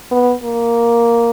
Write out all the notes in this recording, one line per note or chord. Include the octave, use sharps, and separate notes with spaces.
B3
A#3